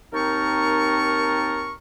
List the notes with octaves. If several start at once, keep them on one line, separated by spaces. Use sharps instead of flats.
D#2 C4 D#4 A#4 A5 C#6